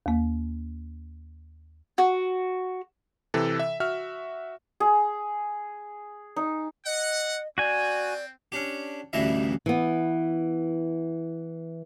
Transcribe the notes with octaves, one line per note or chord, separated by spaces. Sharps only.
D#2 A#3
F#4
C3 E3 A4
E5
F#4 E5 F6
G#4
D#4
D#5 F#5
C4 F#4 D5 G5 G#5
C#4 D4 G4
A1 D2 G2 E3 D#5 E5
E3 B3